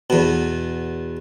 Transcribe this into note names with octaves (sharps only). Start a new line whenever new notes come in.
E2 B2